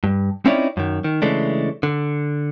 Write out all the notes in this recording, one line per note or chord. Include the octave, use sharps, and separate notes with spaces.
G2
C4 C#4 D#4 E4 C#5 D5
F#2 D#3
D#3
C#3 E3 G#3 A3 D4
D3